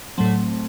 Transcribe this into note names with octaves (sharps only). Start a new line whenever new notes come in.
A2 F#3 A3 C4